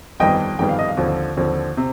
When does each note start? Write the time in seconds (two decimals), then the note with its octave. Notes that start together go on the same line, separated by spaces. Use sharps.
0.20 G1 F2 D#3 G3 B3 D#5 G5
0.59 G1 F2 D#3 G3 B3 G5
0.69 F5
0.79 D#5
0.88 F5
0.97 D#2 D3 F3 C4
1.37 D#2 D3 F3 C4
1.77 C3